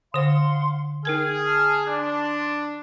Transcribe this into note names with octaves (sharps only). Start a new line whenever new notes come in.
D3 C5 F5 F#5 C6
D#4 G#4 A#4 G5 F6 G#6
A5 F6
D4 C6